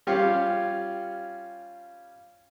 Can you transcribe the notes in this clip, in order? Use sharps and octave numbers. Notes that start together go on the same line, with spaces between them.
G3 C#4 F4 G4 C#5 F5